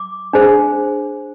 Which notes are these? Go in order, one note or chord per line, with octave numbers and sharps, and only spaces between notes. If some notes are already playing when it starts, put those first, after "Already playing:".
Already playing: D6
D4 G#4 C5